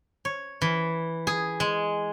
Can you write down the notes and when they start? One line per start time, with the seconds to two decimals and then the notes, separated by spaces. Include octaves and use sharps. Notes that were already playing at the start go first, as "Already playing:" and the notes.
0.25 C#5
0.62 E3
1.27 G#4
1.60 G#3